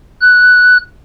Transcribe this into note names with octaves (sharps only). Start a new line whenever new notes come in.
F#6